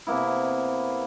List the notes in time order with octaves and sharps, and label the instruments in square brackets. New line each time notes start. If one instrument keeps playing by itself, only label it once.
[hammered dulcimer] C3 A#3 B3 E4